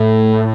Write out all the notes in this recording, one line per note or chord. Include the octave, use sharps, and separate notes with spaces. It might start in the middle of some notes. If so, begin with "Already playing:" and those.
Already playing: A2 A3